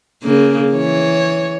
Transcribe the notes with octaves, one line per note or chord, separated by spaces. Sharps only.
C#3 A#3
E3 C#5